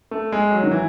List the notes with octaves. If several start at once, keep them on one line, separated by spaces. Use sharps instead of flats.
A3
G#3
F#3
D#3
E3